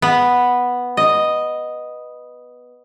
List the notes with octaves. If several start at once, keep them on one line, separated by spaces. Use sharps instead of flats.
B3
D#5